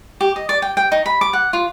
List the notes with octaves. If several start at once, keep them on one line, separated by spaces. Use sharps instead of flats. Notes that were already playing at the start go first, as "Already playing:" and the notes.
G4
D#5
D5
G5
G5
D#4
B5
D6
F#5
F4